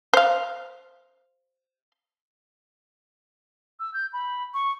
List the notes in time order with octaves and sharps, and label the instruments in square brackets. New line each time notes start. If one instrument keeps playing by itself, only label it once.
[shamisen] C5 F5
[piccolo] E6
G6
B5
C#6